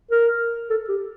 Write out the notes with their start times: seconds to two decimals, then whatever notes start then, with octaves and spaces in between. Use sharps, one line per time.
0.11 A#4
0.70 A4
0.89 G4